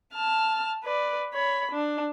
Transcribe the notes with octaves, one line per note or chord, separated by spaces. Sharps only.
A5 F6
B4 D5
C#5 B5
D4